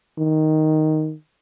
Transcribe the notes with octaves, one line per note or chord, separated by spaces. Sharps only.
D#3